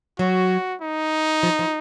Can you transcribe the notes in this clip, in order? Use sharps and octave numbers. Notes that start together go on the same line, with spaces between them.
F#3 F#4
D#4
F3
F3